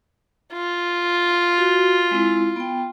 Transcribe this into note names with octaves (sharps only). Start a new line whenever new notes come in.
F4
F#4
G#3 C4 E4
B3 G5